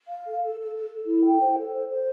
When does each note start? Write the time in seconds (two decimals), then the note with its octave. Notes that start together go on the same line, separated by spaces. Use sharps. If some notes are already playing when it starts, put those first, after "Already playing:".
0.08 F5
0.24 A4
0.42 A4
0.58 A4
0.75 A4
0.90 A4
1.07 E4
1.23 G5
1.40 C5
1.57 A4
1.73 C5
1.89 C5